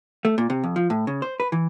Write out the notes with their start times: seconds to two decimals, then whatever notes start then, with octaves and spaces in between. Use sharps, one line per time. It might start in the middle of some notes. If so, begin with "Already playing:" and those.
0.25 A3
0.38 A#2
0.50 C3
0.63 F2
0.76 F3
0.90 A2
1.07 C#3
1.22 C5
1.40 B4
1.52 E3